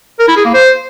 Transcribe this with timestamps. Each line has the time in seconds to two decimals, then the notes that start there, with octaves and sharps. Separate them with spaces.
0.20 A#4
0.28 E4
0.37 G#4
0.45 A#3
0.54 C5